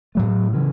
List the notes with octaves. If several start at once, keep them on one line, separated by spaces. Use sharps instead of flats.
A2 F#3 A3
C#3 E3